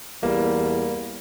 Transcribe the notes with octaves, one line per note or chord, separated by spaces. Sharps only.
E2 G3 A#3